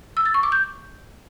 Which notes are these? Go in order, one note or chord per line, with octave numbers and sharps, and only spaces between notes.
E6
A6
C#6
D6
G6